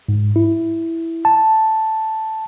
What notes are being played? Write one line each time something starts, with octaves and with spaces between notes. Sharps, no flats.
G#2
E4
A5